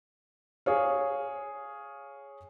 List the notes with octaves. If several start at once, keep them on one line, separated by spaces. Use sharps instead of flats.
G#4 C#5 F5